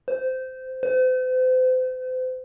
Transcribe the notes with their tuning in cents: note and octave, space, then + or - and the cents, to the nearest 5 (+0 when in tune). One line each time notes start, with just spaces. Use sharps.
C5 -15
C5 -40